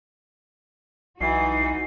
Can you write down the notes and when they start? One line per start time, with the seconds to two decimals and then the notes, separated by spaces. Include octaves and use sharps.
1.21 B1 E3 D#4 F#4 C7